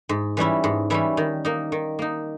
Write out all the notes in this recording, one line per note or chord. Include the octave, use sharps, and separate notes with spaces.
G#2
E3 G3 C#4 E4
G#2
E3 G3 C#4 E4
D#3
A#3 D#4
D#3
A#3 D#4